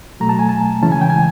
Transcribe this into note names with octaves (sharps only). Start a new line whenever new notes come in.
B2 F#3 A3 A#5
A5
G#5
A5
C#3 E3 G#3 C#4 E4 A5
G#5
G5
G#5